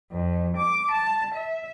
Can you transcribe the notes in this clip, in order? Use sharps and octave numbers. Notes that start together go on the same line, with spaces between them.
F2
D6
A5
E5